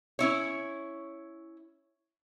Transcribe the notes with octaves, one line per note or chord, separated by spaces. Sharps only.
C#4 E4 C#5